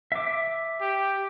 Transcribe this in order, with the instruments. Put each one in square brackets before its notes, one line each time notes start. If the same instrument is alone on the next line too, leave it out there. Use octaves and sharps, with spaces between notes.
[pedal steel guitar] E5 D6
[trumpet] G4